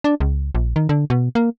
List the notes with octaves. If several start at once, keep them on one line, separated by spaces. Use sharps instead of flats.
D4
C#2
A#1
D#3
D3
B2
A#3